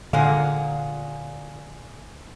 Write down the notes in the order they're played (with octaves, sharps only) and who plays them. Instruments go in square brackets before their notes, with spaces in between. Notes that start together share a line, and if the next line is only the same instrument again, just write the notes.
[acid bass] A#2 [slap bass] D3 [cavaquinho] G#4 F#5 C6 [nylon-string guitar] F5